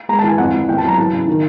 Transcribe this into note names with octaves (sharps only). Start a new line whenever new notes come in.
G#3 A#5
A5
E3 G#5
F2 F#5
F2
E2 G5
A5
F#3 A#5
E3 A5
C#3
D#3